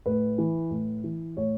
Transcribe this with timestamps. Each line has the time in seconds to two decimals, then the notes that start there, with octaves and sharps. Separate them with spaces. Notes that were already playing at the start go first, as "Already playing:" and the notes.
0.06 A2 B4
0.38 E3
0.70 A2
1.04 E3
1.37 A2 C#5